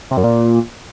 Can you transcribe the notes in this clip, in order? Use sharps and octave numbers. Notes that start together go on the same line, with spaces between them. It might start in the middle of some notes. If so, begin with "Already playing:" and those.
C3
F#2
A#2